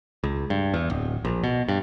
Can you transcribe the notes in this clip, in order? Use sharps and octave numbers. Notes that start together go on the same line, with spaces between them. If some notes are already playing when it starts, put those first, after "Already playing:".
C#2
G2
E2
D1
A#1
B2
G2